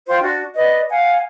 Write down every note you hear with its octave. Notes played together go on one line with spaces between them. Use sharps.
F4 C5 G5
D4 F#4
B4 D5 D#5
F5 F#5 G#5